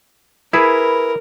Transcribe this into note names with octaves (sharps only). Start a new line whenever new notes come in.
E4 G#4 A#4 B4